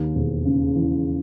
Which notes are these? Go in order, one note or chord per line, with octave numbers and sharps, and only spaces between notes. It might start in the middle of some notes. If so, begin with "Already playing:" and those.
Already playing: D#2
E1
C#3
E3